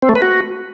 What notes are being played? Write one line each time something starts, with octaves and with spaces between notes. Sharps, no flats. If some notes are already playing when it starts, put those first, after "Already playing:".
C4
A3
B4
F#4